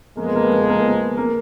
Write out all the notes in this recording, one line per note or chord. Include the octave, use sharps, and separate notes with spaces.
F2 F3 G#3 A#3
B3
A#3
B3
A#3
B3
A#3
B3
A#3
A#3